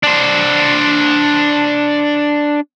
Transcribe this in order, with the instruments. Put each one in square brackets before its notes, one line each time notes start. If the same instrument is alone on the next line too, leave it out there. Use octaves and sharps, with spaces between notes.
[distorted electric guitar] D4 C5